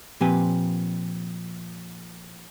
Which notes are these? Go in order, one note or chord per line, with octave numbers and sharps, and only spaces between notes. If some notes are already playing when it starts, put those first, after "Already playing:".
A#2 F3 C4 G4 B4 G#5